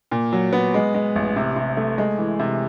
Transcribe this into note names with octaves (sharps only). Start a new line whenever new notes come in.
A#2
F#3
B3
G#3
G#3
A1
C3
C3
A3
G#3
E3
C3